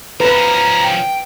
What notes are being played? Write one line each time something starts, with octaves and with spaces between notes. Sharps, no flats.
F3 C#4 B4 A#5
G5